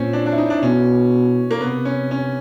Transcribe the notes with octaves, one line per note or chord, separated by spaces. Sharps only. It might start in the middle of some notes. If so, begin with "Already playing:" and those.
Already playing: A#2 C4 C#4
D4
D4
E4
D#4
D4
B2 C#4
A#3
C3 B3
C#4
C#4